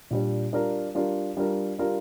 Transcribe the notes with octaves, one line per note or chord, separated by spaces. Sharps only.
A#2 G3 D4
G3 D4 F4 A#4
G3 D4 F4 A#4
G3 D4 F4 A#4
G3 D4 F4 A#4